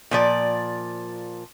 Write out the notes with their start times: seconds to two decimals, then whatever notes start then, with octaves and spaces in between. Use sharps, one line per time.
0.11 A#2 F3 D5